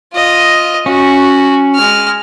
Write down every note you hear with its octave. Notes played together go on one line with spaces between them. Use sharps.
F4 D#5
C#4 F#4
G#3 F6